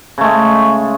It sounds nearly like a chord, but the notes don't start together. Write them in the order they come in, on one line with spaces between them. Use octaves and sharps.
C#3 A3 G#3